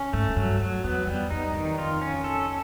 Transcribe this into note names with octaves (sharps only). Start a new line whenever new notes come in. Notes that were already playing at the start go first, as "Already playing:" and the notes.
Already playing: C#4
G#2 A3
G#2
G2 F#3
F2 F#3
E2 B3
F2 G3
F2 D#4
F2 D#3
F4
C#4
A4